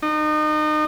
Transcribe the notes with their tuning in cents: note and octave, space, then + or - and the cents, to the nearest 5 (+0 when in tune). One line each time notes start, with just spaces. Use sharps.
D#4 -30